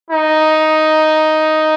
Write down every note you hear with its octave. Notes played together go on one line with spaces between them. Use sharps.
D#4